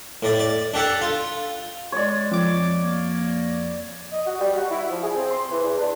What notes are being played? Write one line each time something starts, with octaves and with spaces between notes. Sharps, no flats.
A2 D5
D5
D4 G4 A4 F#5
F4
G#3 C#5 D5
F2 D6
A#3
D#5
F#4
G3
F#4
E4
F3
G#4
C4
C6
E3
E2
D4